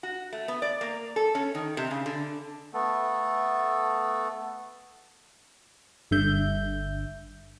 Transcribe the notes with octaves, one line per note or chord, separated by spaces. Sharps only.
F#4
A3
B3
D5
A#3
A4
C#4
D#3
C3
C#3
D3
A3 B3 A4
G1 G2 D3 E5 G6